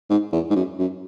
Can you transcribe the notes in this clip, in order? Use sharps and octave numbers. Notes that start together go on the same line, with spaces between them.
G#2
E2
G#2
F#2
F#2